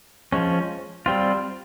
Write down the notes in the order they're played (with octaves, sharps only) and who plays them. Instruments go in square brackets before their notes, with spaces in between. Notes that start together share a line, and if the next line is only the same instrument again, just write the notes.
[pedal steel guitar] F3 G#3 C#4
G3 C4 F4